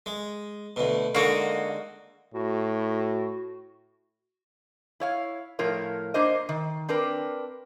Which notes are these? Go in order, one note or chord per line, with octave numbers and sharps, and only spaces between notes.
G#3
D2 B2
D3 G#3 A#3 D#4 F#4
A2 F#4
E4 C#5 F5
A2 F3 F4 A#4 C#5
A#3 D4 C5 D#5
D#3
C4 D4 A#4 B4